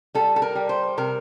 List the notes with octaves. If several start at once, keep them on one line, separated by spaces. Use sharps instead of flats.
G3 A4
A4
A#4
G3
C5
C3 A#4